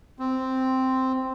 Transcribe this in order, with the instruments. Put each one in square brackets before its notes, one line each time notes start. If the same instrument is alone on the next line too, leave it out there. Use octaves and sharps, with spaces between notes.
[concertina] C4